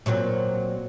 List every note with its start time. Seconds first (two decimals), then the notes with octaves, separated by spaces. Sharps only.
0.06 A#2 F#3 C4